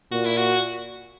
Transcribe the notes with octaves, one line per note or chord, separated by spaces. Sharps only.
A#2 F#4
E4
F#4